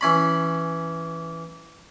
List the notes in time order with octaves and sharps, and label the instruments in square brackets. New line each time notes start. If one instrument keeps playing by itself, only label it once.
[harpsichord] E3 C#4 B5